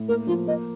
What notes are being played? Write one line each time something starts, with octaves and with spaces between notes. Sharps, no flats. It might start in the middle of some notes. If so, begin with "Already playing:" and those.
Already playing: A2
A#3 A#4
F3 F4
A#3 D#5